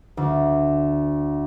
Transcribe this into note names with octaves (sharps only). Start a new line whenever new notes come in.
D2